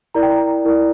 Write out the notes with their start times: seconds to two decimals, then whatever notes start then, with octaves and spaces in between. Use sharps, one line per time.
0.14 E4 A#4 D5 A#5
0.23 G5
0.30 A#5
0.65 E4 A#4 D5